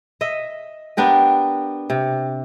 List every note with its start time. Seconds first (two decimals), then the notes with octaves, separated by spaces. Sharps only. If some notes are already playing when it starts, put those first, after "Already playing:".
0.21 D#5 E5
0.97 B3 D4 G4 A#4
1.90 C3